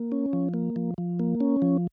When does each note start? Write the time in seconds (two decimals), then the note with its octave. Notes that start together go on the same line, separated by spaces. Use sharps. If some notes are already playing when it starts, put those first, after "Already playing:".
Already playing: A#3
0.12 C#4
0.33 F3
0.54 A#3
0.76 F3
0.98 F3
1.19 A#3
1.40 C#4
1.62 F3